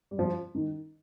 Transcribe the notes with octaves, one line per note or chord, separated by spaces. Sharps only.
G3
F3
D#3